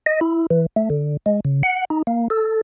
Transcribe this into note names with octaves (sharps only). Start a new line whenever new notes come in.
D#5
E4
E3
A3
D3
G#3
C#3
F#5
D#4
A#3
A4